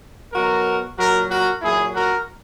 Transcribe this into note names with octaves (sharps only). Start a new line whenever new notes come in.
B2 F#3 F#4 A#4
A#2 F#3 F#4 A#4
F#4 A#4
A#2 F#3 E4 G#4
F#4 A#4